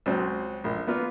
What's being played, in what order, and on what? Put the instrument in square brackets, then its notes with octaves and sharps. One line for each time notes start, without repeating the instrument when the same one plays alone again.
[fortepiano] C#2 F#3 C4 C6
A#1
A#3 B3 F4